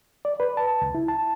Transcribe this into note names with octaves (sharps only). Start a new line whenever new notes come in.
D5
B4
A5
C#2
E4
A5